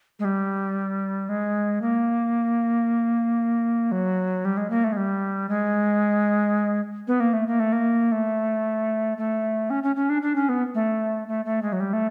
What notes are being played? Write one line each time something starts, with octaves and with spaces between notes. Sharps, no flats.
G#3
G3
G#3
A#3
F#3
G3
G#3
A#3
A3
G#3
G3
G#3
B3
A#3
A3
A#3
A3
A#3
A3
A3
C#4
C#4
C#4
D4
D4
C#4
B3
A3
A3
A3
G#3
F#3
G3
A3